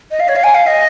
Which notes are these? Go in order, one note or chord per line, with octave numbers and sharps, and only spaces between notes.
D#5
F5
C#5
F5
G#5
F5
D#5